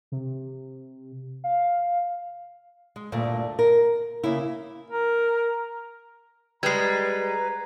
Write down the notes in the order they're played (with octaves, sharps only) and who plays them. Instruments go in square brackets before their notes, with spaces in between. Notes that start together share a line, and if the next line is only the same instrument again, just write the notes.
[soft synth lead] C3
F5
[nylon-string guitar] G#3
D2 G2 A#2 A3
A#4
C#3 A#3 C#4 E4
[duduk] A#4
[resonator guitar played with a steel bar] G3 G#3 [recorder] B4 [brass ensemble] A#5 [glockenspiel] G#6 C7